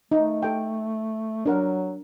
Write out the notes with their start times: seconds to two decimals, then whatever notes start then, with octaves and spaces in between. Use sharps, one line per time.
0.12 A3 D#4
0.43 A4 G5
1.46 F#3 D4 A#4 F#5